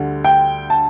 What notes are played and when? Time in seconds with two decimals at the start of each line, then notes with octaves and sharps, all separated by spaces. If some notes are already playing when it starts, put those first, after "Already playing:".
Already playing: D2 D3 G3
0.24 G5
0.70 A5